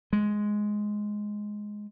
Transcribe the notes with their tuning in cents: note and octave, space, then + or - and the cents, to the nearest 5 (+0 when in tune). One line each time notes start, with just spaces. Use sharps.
G#3 +5